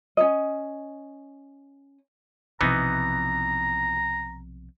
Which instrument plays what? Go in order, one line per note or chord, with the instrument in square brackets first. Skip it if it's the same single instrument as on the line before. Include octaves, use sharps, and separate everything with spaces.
[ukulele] C#4 D#4 D#5
[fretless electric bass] B1 C3 F3 [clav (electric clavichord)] E3 B3 D#4 [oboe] A#5